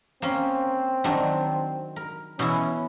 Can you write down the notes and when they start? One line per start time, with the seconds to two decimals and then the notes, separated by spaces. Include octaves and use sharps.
0.22 A#3 C4 C#4
1.04 D#3 F#3 D4
1.96 A#4
2.39 B2 E3 C#4 E4